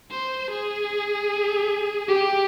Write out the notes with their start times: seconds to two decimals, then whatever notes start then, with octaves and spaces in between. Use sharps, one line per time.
0.11 C5
0.50 G#4
2.08 G4